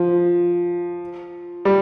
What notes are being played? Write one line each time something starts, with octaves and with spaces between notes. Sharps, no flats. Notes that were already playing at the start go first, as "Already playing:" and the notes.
Already playing: F3
G3